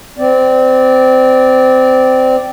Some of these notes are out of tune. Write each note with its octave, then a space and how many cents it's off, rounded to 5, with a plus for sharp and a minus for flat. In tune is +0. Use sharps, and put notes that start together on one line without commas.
C4 -20 D5 +0